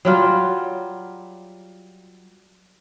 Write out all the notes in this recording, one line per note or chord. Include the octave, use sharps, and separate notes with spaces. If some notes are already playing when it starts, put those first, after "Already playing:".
F#3 G3 F4